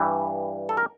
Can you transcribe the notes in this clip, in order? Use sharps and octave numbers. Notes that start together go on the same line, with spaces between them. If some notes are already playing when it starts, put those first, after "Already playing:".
Already playing: G2 E3 G3
A4
A#4